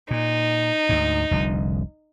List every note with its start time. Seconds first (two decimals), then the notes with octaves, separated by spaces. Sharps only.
0.11 A#2 D#4
0.89 D2 G#2
1.31 F1 C2 D3